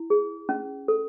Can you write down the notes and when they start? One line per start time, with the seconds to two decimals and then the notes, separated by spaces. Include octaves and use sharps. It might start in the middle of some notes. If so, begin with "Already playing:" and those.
Already playing: E4
0.10 G#4
0.49 C#4
0.88 A4